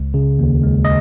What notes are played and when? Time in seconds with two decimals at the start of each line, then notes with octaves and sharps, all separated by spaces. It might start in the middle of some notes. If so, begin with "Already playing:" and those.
Already playing: C#2
0.14 C#3
0.39 D#2
0.63 G#3
0.85 D#5